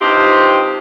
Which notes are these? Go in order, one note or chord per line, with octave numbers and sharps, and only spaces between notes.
G2 C3 F3 C4 D#4 G4